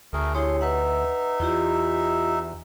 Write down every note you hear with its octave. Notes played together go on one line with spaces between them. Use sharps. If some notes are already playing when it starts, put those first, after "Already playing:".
D2 A3 G#4 A#4
E4 G4 G#4 C#5 C6
D#4 B4 E5 F#5
E2 E4 F4 G4